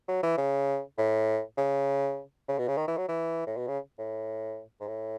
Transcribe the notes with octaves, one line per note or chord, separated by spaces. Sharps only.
F#3
E3
C#3
A2
C#3
C#3
B2
C#3
D#3
E3
F#3
E3
A2
B2
C#3
A2
G#2
A2